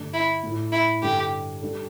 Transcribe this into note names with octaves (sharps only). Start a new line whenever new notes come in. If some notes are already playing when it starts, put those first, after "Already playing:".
Already playing: G2 D3 A3 D4
E4
A2 A3 E4
E4
G2 D3 G3 D4 G4 A4
G3 D4 A4